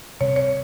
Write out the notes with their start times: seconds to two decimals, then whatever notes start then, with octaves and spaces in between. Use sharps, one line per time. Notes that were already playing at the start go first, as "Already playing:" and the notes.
0.20 C3 G3 C4 C#5
0.36 C#5